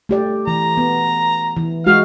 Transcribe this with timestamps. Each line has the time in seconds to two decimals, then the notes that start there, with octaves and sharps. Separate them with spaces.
0.09 A3 G4 D5
0.47 E3 A#5
0.77 B3
1.56 E3
1.87 G#3 F#4 F5 F6